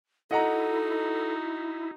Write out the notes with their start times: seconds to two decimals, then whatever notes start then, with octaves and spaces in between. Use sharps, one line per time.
0.31 D#4 E4 F#4 A4 D#5 F#5 A#5